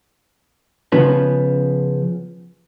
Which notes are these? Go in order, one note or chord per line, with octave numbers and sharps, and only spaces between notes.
C#3 F3 B3